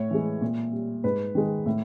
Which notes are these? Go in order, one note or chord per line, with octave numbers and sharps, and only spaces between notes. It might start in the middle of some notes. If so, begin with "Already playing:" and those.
Already playing: A2 C#5
E3 G#3
A#2
G3
G#2 B4
D#3 G#3
A2